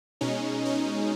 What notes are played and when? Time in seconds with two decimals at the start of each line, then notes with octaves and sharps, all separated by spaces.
0.21 B2 G#3 C#4 D#4
0.65 C#4 D#4